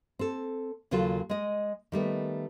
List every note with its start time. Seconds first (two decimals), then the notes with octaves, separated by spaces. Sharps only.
0.19 C4 A4
0.91 D#2 C#3 F#3 F4 F#4 A4
1.29 G#3 D#5
1.92 D#3 G3 A3 B3